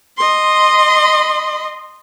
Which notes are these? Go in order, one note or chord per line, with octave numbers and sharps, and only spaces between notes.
D#5 C6